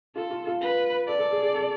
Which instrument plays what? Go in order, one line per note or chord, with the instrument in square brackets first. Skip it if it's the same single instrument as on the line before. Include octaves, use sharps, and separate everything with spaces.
[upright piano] F4 [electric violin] A4
[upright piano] F4
F4
[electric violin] B4
[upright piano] A4 [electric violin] D5
[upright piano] A4
G#4
G#4
A4